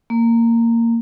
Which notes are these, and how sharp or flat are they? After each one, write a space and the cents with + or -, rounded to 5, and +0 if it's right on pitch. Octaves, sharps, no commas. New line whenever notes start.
A#3 -15